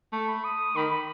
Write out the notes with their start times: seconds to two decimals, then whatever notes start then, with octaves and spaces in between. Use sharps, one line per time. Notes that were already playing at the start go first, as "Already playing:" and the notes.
0.13 A3
0.28 B5
0.44 D#6
0.76 D#3 B5
0.91 B5